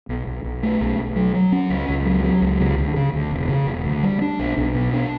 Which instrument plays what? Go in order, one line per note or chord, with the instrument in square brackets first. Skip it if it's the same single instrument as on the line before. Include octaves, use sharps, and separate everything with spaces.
[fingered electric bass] B1
B1
B1
A3
B1
B1
F#3
F#3
C#4
C#2
C#2
F#3
F#3
C#2
C#3
D2
C#3
D2
E1
C#3
E1
D2
G3
D4
B1
B1
B2
D4